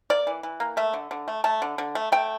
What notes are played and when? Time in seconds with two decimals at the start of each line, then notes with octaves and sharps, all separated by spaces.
0.10 A#3 D5
0.27 E3
0.43 E3
0.60 A#3
0.77 A3 E5
0.93 D3
1.11 D3
1.28 A3
1.44 A3 A5
1.62 D3
1.78 D3
1.95 A3
2.12 A3 G5